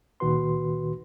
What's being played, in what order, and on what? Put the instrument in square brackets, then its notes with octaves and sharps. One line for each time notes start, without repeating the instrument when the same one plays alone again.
[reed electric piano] C#2 A#2 D#3 F#4 B4 C6